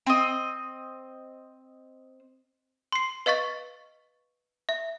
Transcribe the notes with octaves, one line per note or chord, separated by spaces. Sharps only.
C4 D#5
C6 C7
B4 D#5 F5 C#6 A6
E5